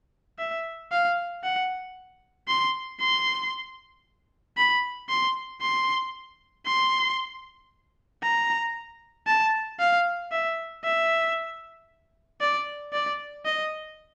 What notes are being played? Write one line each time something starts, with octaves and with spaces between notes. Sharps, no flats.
E5
F5
F#5
C6
C6
B5
C6
C6
C6
A#5
A5
F5
E5
E5
D5
D5
D#5